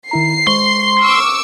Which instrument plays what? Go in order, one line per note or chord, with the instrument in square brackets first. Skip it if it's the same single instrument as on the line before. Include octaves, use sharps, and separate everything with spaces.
[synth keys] D#3 E4 A#5 [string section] C7
[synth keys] G#3 C5 C#6 [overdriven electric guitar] C6
[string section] C#6 D6 E6 [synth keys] F6